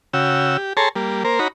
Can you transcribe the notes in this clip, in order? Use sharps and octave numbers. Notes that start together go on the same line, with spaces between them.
C#3 F#4 G5 E6
G4
G#4 A4 C#5 A5 A#5 C6
G3 A#3
A#3 A#4 C5
D#4 F#4 C#5 A#5 B5